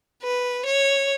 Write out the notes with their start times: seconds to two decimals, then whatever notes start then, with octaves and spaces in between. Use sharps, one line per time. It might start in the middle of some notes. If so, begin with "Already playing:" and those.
0.23 B4
0.65 C#5